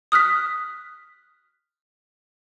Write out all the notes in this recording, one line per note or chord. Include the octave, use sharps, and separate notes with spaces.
D#6 F6 F#6 B6